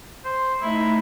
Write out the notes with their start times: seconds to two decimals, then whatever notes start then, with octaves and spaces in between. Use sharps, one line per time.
0.25 C5
0.62 A3 D#4 E4